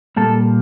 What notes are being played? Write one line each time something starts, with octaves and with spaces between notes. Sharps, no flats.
A#2 G3 A#3 A4 A5